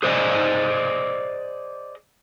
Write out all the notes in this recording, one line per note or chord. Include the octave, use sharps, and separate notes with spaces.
G#4 C5 D5 D#5 G#5